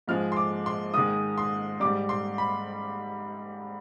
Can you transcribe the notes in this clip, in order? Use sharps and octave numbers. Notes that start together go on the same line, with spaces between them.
G#2 F3 G#3 F6
C6
D6
C6
G#2 D#3 G#3 D#6
C6
G#2 G3 D6
C6
B5